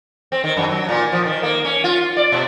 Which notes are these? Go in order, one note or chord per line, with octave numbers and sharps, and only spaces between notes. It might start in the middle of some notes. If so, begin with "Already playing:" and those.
C4
D#3
F#2
F#3
A#2
F3
D#3
A#3
C#4
F4
D5
B2